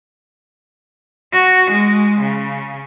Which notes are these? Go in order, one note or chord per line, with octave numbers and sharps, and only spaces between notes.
F#4
G#3
C#3